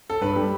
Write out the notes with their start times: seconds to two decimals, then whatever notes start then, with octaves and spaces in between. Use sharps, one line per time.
0.10 A4
0.21 G2 B4
0.36 G3